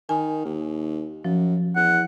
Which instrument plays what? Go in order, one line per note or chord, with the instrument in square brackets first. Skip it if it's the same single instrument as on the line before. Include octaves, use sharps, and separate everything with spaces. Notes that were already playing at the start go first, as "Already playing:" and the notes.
[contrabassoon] D#3 [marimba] G#5
[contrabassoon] D#2
[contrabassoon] F#2 [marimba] F3
[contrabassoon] E2 [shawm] F#5